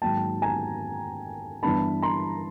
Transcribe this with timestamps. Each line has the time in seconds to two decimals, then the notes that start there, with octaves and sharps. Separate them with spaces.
0.02 G#2 D#3 F#3 A#3 G5 A5
0.42 G#5 A#5
1.63 G2 E3 G3 B3 D4 A5 B5
2.02 A#5 C6